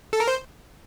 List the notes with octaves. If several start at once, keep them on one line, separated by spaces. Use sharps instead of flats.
A4
A#4
C5